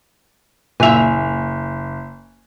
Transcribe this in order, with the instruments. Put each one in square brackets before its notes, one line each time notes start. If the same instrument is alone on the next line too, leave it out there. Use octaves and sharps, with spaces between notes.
[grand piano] F#1 F7 [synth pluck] A#2 E5 [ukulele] G#5